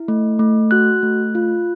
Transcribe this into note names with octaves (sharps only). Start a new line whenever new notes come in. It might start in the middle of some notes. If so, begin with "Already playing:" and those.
Already playing: E4
A3
A3
F#4 F#6
A3
F4